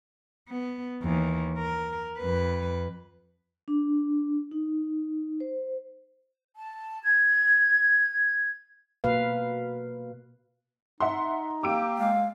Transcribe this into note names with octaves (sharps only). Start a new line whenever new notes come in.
B3
D#2 E3
A#4
F2 B4
D4
D#4
C5
A5
G#6
B2 A#3 B4 F5
D#4 E5 F#5 C6
A#3 G4 D6 E6 D7
G#3 F5